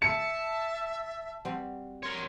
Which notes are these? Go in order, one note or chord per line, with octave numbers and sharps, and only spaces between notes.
E5 A5 C#7
G3 C4 F#4
A#4 C#5 C6